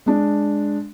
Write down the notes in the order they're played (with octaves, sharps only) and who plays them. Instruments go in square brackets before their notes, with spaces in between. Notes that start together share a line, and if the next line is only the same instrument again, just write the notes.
[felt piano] G#3 D4